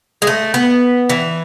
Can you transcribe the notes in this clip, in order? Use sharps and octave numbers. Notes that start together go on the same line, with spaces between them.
G#3
A3
B3
E3